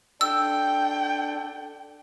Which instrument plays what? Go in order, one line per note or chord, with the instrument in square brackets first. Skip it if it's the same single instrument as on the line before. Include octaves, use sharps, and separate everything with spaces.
[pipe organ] D4 A4 [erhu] G5 [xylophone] E6